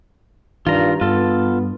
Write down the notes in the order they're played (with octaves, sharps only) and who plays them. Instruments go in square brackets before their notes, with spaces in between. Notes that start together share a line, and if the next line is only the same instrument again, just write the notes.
[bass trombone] G2 [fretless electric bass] D#3 [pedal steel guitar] F4 A#5
[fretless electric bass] G2 [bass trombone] B3 [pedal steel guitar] F4 A4